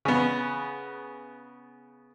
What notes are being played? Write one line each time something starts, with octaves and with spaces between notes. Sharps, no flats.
C#3 B3